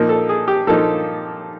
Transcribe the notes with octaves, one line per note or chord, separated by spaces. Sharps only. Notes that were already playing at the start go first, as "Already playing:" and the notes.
Already playing: A#2 F3 A#3 D#4 A#4
A4
G#4
G4
A#2 F3 A#3 D#4 A4